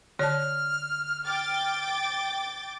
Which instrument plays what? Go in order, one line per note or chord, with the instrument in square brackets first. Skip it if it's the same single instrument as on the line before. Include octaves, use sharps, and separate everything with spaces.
[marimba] D3 A5 [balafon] C#5 [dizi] F6
[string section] G5 D6 A6